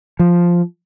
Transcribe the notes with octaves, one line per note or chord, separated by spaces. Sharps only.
F3